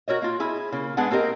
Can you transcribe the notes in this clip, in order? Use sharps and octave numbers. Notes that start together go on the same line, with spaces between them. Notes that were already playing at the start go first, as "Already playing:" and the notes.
F#4 A#4 C#5 D#5
A#3 F4
E4 G#4
C#3 A#3
G#3 B3 D4 G#4 F#5
A#3 C4 G4 A#4 D#5